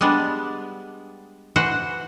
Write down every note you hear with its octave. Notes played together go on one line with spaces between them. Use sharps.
G3 G#3 B3 D4
E3 F#4 C5 F#5